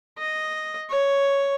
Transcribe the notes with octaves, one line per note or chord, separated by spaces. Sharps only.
D#5
C#5